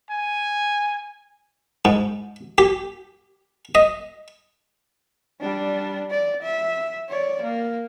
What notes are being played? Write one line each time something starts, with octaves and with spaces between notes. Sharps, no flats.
G#5
G#2
G4
D#5
G3 D4
D5
E5
C#5 D5
A#3